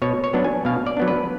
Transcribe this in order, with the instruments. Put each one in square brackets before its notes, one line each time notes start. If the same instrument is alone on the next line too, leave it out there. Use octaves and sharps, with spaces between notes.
[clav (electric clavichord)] B2 C#5
C#5
F#3 B3 D4
G#5
B2 F5
D5
F#3 B3 D4
B4